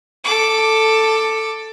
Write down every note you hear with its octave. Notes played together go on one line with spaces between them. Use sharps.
A4 D6